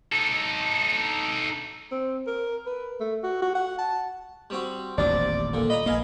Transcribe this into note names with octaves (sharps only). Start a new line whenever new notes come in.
D#4 A4
C4
A#4
B4
A3
F#4
F#4
F#5
A5
G3 C4 F#4
D#1 A1 E2 C3 D4 D5
A#2 D3
D#5 A#5 B5
A#1 A#3 B4 D#5 F5 G#5